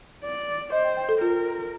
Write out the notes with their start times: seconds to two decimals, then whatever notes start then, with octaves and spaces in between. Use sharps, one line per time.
0.24 D5
0.72 C5 D#5
0.85 G5
0.97 G5
1.09 A4
1.21 F4 A#4